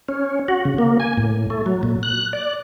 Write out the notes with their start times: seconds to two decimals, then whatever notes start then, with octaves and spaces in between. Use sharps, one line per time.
0.08 C#4
0.48 F#4
0.65 C#3
0.78 A#3
1.00 G#5
1.17 A2
1.50 A3
1.66 F#3
1.83 A#2
2.03 F#6
2.33 D5